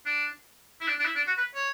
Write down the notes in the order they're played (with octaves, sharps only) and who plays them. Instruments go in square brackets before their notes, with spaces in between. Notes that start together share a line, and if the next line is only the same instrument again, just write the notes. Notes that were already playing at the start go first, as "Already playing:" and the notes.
[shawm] D4
E4
D4
D4
E4
D4
F#4
B4
C#5